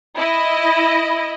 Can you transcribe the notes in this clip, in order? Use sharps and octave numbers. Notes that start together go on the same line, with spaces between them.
E4 D#5